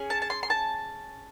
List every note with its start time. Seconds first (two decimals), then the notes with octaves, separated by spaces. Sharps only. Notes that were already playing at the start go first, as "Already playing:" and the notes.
Already playing: C#4 G#4
0.10 A5
0.22 A5
0.30 C6
0.43 C6
0.50 A5